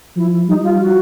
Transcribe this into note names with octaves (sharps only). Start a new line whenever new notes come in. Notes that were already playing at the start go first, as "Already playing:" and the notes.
F3 E4
G3 D#4
F4
F#4